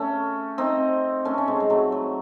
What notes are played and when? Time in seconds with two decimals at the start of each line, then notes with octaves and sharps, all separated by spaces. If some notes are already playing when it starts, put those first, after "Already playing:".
Already playing: A3 C#4
0.58 C4 D#4
1.25 A3 C#4
1.38 C#4
1.48 G#3 C4
1.60 G#3
1.70 F#3 A3
1.92 F#3